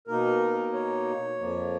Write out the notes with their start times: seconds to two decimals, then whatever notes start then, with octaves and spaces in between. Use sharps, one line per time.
0.07 B2 A#3 D#4 A#4
0.73 C#5
1.39 F2 F3 A#3